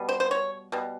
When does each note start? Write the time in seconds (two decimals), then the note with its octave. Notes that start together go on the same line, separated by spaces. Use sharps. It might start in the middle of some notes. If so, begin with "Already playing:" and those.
Already playing: B2 G3 B3
0.09 C5
0.20 C5
0.31 C#5
0.72 B2 G3